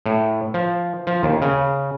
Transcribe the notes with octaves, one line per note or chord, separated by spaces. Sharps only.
A2
F3
F3
D#2
C#3